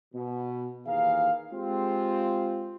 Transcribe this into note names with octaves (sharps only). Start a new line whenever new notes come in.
B2
D#2 E3 G#4 A#4 F5
G#3 C4 F4 G4